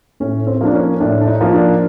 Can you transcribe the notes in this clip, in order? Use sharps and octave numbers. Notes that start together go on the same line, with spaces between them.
A2 C#4
C4
F3 A#3 D4
C#4
A2 D4
D4
D#4
F3 A#3
D4